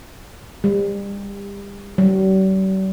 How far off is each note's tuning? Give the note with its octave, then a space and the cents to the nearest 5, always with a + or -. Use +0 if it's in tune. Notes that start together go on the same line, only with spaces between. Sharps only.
G3 +35
G3 -45